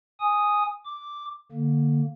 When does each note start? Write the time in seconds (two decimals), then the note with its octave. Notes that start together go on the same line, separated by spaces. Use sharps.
0.20 G#5 D#6
0.85 D6
1.52 D3 A#3